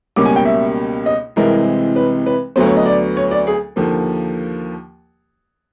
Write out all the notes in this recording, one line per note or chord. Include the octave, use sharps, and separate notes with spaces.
C#2 B2 G3 A#3 C#4 D6
G#5
G5
E5
D#5
C2 C3 E3 G#3 C4 A#4
B4
B4
D2 D3 F#3 B3 C5
C#5
D#5
D5
C#5
D5
G#4
D#2 D3 F3 A#3